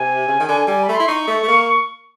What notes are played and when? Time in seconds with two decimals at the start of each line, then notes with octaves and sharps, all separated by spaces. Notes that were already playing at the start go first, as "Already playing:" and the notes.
Already playing: C3 G#5
0.28 C#3
0.40 D#3
0.49 D3
0.68 G3
0.83 B5
0.89 A3
0.95 E4 C6
1.08 D#4 C#6
1.28 A3
1.43 A3
1.48 A#3